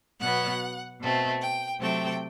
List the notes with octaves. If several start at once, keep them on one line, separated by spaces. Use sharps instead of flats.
B2 F#3 B3 F#5
B2 A3 C4
G5
C3 F#3 A3 C4 G5